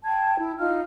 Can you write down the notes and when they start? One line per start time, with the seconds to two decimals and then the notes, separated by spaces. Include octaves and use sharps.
0.04 G5 A5 G#6
0.39 E4
0.59 D#4 F4 F5 F6